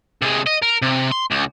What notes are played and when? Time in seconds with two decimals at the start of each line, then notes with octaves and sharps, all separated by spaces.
0.22 C3 G#3
0.47 D#5
0.62 A#4
0.82 C3
1.11 C6
1.31 C#2